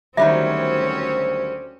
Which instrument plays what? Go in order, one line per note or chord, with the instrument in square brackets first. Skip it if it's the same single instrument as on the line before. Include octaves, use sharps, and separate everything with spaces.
[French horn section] D2 C5 [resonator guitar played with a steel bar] D#3 F#3 G3 [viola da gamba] C4 C#4 [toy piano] E5